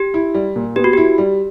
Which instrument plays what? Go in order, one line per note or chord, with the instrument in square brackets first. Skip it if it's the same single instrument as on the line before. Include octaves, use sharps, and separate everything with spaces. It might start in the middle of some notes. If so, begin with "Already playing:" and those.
Already playing: [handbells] G4
[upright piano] E4
G3
A#2
[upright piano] B3 [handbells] G4
[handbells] F#4
[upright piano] E4 [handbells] G4
[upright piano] G3